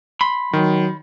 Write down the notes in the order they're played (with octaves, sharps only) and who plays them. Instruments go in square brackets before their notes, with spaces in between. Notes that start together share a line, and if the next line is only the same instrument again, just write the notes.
[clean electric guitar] B5 C6
[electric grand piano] D#3 [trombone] F#3